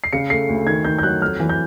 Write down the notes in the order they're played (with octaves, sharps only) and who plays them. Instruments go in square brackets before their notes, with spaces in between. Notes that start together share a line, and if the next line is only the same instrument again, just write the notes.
[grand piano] C7
[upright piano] C#3 [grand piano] C#7
[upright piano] A3 [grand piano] C7
[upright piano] D2
[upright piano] D#3 [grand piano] G#6
[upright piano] D#3 [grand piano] G6
[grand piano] G6
[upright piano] F#3 [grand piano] F#6
[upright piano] F2 [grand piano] F6
[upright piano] E3
[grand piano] G6